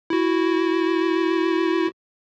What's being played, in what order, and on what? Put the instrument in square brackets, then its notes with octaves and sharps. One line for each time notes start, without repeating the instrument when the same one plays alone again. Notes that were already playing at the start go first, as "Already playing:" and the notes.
[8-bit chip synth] E4 F#4